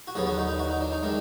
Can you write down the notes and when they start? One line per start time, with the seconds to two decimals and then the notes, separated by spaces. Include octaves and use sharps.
0.07 F#4
0.15 D#2 D3 F#3 B3 G#4
0.27 F#4
0.38 D#4
0.48 D#4
0.59 F#4
0.70 D#4
0.81 D4
0.92 D#4
1.03 D#3 G#3 D4